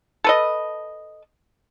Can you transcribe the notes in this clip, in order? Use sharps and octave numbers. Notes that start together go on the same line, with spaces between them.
A4 B4 D#5